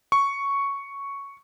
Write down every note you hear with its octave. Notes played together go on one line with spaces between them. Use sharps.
C#6